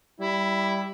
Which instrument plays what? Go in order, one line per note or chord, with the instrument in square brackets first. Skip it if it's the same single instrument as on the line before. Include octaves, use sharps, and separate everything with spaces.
[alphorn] G3 [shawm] E4